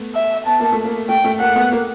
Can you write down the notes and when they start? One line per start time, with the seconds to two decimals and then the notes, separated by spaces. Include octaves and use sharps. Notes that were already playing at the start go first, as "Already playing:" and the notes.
Already playing: A3 B3
0.15 E5
0.46 B3 A5
0.60 A#3
0.72 A3
0.85 A#3
1.09 A3 G5
1.24 A3
1.40 A#3 F#5
1.55 A3 B3
1.72 A#3